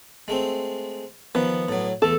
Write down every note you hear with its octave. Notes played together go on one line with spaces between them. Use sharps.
G#3 A3 C4
D#3 F3 B3
A2 F#3
E2 A3 A4